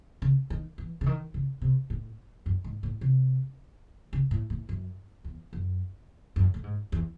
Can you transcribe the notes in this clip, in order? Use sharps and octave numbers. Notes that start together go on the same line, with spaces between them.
C#3
D#3
E3
C#3
D#3
C#3
C3
A2
F#2
G#2
A2
C3
C#3
A2
A2
F#2
E2
F#2
F#2
A2
G#2
E2